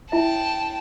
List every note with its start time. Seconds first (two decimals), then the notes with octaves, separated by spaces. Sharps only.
0.12 E4 E5 G5 A5